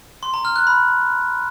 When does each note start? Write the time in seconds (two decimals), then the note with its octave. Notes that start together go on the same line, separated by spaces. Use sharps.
0.23 C6
0.34 A#5
0.45 F6
0.56 F#6
0.67 B5